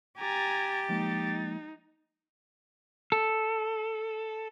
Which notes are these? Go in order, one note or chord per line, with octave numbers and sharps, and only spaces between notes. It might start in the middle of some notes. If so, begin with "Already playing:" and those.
G4 G#5 A#5 A6
F3 G#3 A#3 D#4
A4